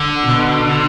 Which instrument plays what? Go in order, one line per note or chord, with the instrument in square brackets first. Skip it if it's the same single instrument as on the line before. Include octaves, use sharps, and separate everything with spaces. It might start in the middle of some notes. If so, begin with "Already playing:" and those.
Already playing: [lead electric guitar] D3
[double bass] B2